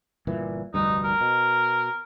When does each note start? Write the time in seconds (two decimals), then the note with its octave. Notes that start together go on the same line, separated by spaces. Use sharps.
0.27 G1 A#2 E3
0.74 F1 D2 G2 D#4
1.04 A#4
1.21 B2